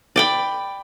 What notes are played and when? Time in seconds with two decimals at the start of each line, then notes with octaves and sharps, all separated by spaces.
0.16 D5 G5 B5